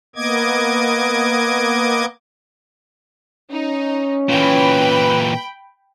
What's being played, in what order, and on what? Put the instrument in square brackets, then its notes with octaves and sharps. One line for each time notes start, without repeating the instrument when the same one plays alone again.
[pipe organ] A#3 B3 D#5 D6 G#6
[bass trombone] C#4 [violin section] D#4
[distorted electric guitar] A#2 E3 [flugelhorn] B4 [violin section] G5 B5